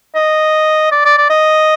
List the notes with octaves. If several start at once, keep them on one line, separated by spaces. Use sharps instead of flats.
D#5
D5
D5
D5
D#5